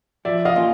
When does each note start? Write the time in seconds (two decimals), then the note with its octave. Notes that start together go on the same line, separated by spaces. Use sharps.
0.25 F3 D5 E5
0.45 D#5 F5
0.55 A#3 C#4 F4